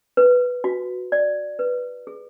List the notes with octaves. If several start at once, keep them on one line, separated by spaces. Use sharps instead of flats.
B4
F#4
D5
B4
G#4